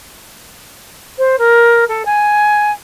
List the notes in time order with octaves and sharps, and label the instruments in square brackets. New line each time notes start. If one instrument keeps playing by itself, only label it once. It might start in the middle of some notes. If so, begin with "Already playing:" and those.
[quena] C5
A#4
A4
G#5